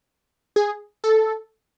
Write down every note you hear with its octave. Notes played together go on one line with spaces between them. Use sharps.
G#4
A4